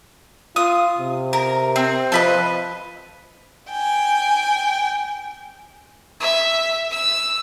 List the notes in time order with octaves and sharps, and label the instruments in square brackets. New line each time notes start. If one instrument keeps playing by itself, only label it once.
[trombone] F4 [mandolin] D#6
[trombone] C3
[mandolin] A#4
C4
[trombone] F3 [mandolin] A4 B4 D#5
[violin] G5 G#5
E5
E6